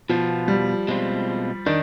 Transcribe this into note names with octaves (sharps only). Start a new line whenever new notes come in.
B2 F3 B3 F4
G3
B2 G#3 C4 F4
D#3 D4